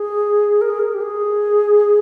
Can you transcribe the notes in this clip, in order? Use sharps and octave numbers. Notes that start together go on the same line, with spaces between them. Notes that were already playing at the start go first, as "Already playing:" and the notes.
Already playing: G#4
A#4
G#4
A#4
G4
G#4